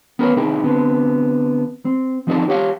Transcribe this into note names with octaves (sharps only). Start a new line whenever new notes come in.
B3 C#4 A#4 B4 C#5
C3 C4 D#4 E4 G#4 G5
D3 B3 C4
C4
F3 C4 D#4 F4 A4 D5
G4 C#5 F5 F#5